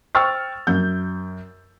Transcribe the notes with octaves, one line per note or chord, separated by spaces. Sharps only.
C5 G5 C#6 E6 F6 A6
F#2 G6